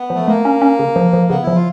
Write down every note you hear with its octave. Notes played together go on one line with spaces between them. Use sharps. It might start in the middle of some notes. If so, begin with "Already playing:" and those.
Already playing: B3
F3
A3
A3 A#3
C#4
C#4
C#3
F3
F3
C#3 B3
F3 E4
F4